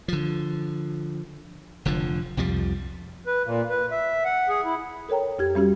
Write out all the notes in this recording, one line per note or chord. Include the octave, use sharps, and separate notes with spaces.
D3 F3
F1 D3 F3
C2 F2 F3 G3
B4
A#2
B4
E5
F#5
G#4
E4
A4 A#4 C#5 G5 A#5
F2 G4 G#6
G3 C#4 F#4 G4